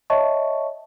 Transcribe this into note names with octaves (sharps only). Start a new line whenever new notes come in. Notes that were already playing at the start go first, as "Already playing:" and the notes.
C#5 D#5 E5 A5 C#6